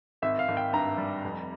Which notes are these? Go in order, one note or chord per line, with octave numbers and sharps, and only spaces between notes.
G#1 E5
F5
G#1
G5
G2 A#5
G3
F1